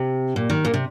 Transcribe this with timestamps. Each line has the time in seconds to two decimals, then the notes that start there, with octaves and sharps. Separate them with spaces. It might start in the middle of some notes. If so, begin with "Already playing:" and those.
Already playing: C3
0.36 A#2
0.50 D#3
0.65 A#2
0.74 C3